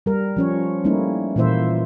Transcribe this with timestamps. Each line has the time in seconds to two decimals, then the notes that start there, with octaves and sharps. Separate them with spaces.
0.06 G3 A#4
0.37 F3 C#4 C#5
0.84 G3 A3 A#3 C#4 D#4 E4
1.36 A#2 E3 A#3 E4 C5 E5